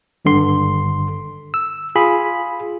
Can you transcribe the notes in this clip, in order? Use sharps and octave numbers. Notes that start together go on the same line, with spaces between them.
G#1 G2 D3 C6
E6
F4 G#4 B5